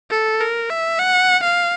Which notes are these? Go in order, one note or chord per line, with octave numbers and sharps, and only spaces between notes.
A4
A#4
E5
F#5
F5